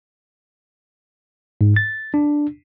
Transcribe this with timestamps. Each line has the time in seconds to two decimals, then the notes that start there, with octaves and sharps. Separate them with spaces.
1.61 G#2
1.76 A6
2.14 D4